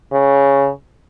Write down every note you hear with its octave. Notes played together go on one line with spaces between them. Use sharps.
C#3